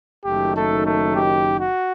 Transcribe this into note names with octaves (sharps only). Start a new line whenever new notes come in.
F#1 F#2 D#3 A3 D#4 G4
A3 A4
A3 A4
G4
F#4